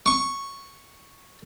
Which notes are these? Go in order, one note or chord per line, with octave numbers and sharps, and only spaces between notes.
C#6